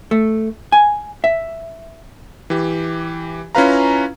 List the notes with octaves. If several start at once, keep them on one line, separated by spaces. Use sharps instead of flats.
A3
G#5
E5
E3 G4
C#4 E4 F4 B4 F5 A#5